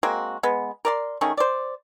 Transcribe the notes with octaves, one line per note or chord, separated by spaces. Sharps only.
G#3 A#3 C4 F#4
G#3 B3
A#4 D5 C6
D#3 A3 C#4 G#4
C5 D5